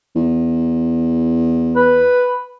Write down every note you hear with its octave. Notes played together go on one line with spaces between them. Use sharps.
E2
B4